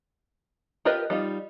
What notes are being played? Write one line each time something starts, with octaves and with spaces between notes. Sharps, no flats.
F4 G4 A#4 B4 D#5
G3 D#4 F4